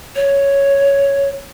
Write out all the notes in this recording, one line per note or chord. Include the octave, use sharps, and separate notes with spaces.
C#5